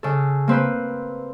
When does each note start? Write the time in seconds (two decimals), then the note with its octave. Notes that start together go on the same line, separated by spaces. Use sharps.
0.03 C#3 A4
0.48 A#3 C4 B4